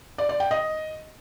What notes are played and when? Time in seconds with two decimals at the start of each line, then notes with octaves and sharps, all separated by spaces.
0.18 D5
0.29 D5
0.40 G5
0.51 D#5